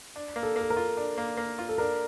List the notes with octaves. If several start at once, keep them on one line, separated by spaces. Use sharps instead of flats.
D4
A#3
A4
A#3
A4
A#4
F4
D4
A#3
A#3
F4
A4
D4 A#4